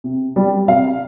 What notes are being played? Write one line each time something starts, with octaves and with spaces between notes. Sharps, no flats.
C3
G3
C3 F5